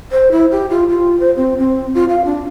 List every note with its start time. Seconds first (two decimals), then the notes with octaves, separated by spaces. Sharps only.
0.12 C5
0.31 E4
0.51 G4
0.70 F4
0.89 F4
1.20 C5
1.36 C4
1.58 C4
1.95 F4
2.09 F5
2.25 D4